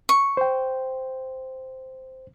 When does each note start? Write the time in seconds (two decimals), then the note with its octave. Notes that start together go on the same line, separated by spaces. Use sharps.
0.09 C#6
0.37 C5 G5